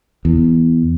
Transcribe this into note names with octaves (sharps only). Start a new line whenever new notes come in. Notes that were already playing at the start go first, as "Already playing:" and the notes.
E2